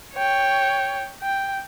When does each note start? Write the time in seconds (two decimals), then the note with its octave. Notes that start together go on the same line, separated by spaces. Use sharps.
0.14 C#5 G5
1.22 G5